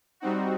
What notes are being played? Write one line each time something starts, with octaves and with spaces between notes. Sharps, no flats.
G3 C4 D#4 F#4